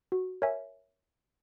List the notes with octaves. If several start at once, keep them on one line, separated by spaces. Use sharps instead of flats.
F#4
A#4 C#5 E5 G#5